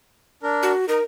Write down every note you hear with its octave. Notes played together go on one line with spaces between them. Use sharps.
D4 A#4
F#4
D#4 A#4